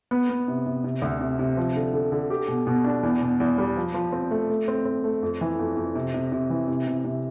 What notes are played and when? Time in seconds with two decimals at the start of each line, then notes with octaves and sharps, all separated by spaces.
0.11 B3
0.29 B3
0.48 C3
0.66 C3
0.84 C3
1.02 D2
1.21 C3
1.39 C3
1.57 F3
1.75 D3
1.93 D3
2.12 D3
2.30 G4
2.48 B2
2.67 B2
2.84 D4
3.03 E2
3.21 B2
3.40 E2
3.58 G3
3.77 F3
3.94 F3
4.12 C4
4.31 A3
4.50 A3
4.68 C4
4.85 C4
5.04 A3
5.23 F2
5.41 E3
5.59 F2
5.77 F2
5.95 C3
6.14 C3
6.32 C3
6.50 E3
6.68 C3
6.87 C3
7.05 C3